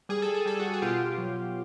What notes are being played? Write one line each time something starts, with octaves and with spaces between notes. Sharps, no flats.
G3 G#4
A4
G#4
G3 A4
F#4 G#4
G#4
B2 F4 G4
F#3